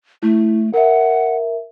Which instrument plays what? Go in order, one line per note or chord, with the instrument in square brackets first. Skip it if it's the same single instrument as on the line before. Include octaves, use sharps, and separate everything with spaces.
[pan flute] A3 [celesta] E4
[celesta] A#4 E5 [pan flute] F#5